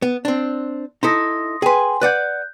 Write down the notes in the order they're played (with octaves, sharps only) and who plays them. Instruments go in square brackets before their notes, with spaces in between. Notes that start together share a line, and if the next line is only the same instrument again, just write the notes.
[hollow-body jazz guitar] B3
C4 D4
[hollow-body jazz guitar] D#4 E4 A4 [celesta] C6 D#6 A#6
[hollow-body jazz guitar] G#4 B4 [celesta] G5 G#5 C6
[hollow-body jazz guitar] B4 D5 F#5 [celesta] F#6 G6